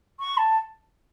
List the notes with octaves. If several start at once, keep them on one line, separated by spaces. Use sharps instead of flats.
C#6
A5